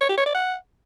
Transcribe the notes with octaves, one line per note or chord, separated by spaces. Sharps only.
C#5
G4
C#5
D5
F#5